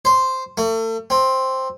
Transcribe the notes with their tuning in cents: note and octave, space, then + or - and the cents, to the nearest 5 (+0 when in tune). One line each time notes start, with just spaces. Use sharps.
C5 -5
A3 +40
C4 +5